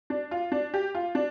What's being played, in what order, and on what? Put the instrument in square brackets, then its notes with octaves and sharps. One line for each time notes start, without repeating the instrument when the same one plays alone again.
[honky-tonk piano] D4
F4
D4
G4
F4
D4